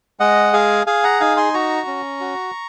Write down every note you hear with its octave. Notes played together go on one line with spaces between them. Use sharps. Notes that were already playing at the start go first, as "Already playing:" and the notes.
G#3 D#5 F#5
G#4 F5 G#5
G#4 F5 G#5
F#5 A#5
D#4 F5 G#5
G#5 C6
F#4 A#5 C#6
C#4
F#4